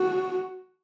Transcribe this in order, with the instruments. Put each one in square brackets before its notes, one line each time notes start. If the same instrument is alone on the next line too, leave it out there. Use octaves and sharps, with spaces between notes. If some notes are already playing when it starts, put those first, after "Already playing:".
Already playing: [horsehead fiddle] F#4